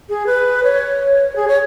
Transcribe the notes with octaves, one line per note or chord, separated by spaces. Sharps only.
G#4
B4
C#5
G#4
C#5